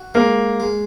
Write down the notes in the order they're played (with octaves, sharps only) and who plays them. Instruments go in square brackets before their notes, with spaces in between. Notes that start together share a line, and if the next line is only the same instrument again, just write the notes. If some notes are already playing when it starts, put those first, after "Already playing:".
Already playing: [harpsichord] F#4
[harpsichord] G#3 [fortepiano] A#3
[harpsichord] G#3